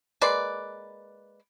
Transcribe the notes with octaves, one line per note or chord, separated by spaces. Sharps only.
G#3 A#3 B4 D5